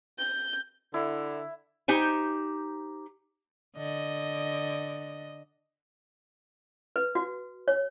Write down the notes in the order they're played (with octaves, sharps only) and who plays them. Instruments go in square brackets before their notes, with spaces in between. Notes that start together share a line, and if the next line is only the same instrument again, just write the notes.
[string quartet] G6
[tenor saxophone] D3 [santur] E4
[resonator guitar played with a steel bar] D#4 G4 C5 G#5
[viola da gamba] D3 D#5
[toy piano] B4
F#4
C#5